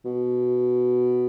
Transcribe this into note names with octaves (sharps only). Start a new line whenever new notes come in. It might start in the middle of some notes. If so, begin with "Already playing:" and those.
B2